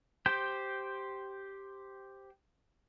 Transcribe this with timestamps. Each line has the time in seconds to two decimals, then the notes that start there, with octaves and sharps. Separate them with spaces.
0.26 G4 C5 G5